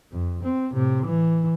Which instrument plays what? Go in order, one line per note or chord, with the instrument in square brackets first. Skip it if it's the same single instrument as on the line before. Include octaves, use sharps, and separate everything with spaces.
[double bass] F2
C4
A2 C3
E3